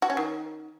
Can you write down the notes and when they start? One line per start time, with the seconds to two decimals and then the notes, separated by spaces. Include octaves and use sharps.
0.02 F#4
0.10 C#4
0.17 D#3